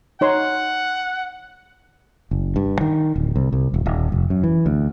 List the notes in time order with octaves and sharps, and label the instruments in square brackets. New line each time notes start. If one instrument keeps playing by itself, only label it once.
[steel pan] D#4 C#5 C6 [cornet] F#5
[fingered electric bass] F#1
G2
D#3
D1
C2
C2
D#1
D#1
F1
F#2
E3
D2